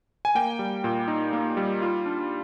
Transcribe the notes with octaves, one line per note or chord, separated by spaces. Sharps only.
G#5
A#3 G5
G3
A#2
D#4
A#3
G3
F4
D4